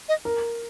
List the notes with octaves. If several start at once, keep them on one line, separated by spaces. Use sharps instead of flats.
D#5
A#4